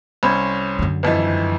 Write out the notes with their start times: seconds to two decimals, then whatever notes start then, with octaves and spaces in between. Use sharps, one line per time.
0.23 C2 C#4 C5 B5 C6 G#6
0.79 F#2 D3
1.03 G#1 F2 E3 B4 D#5